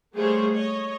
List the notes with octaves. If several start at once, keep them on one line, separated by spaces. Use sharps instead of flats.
G3 A3 A#3 G#4 C5 C#5
C#5 D#5